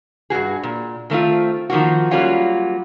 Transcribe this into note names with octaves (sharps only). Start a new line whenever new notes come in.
G2 C#3 F#4 G#4
A#2
D#3 A3 C4 F4
D#3 F3 A#3 F#4
F#3 G3 A#3 C#4 F4 F#4